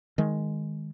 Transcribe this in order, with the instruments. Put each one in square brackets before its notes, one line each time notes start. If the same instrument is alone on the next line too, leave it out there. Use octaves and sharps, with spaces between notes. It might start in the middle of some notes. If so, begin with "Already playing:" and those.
[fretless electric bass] D#3 G#3